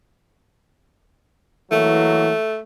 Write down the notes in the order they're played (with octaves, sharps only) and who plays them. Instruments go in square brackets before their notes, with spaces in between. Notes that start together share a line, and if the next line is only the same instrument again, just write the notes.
[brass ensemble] E3 F#3 A#3 [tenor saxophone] A3